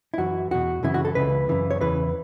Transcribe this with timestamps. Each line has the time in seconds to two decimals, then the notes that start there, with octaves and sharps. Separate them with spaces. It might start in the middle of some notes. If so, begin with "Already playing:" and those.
0.14 E4
0.18 F#2 E3 F#4
0.51 E2 B2 F#4
0.83 F#2 C#3 E3 E4
0.94 F#4
1.05 A4
1.15 C#2 C#3 E3 B4
1.49 F#2 C#3 E3
1.71 C#5
1.81 E2 C#3 E3 B4